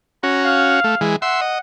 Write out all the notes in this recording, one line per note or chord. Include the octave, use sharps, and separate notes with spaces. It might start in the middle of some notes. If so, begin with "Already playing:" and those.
C#4 F#4 A#5
F5
A3
E3 G#3
E5 F#5 C6
D#5